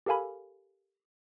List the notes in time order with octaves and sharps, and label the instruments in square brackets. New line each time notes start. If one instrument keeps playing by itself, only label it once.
[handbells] G4 A4 A#4 F5 G#5 B5